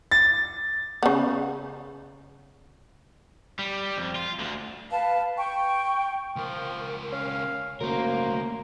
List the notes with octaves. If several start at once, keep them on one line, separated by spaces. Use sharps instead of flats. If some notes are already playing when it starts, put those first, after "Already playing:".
A6
C#3 B3
G3
F2
F4
D2 D3
B4 F5 A5
G5 C#6
C#2 F3 A#4
C#4 F5
C#2 F#2 A3 A#3 A#4 C5